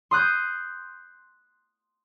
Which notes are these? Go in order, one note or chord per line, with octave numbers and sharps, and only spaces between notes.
C6 D#6 F#6 G6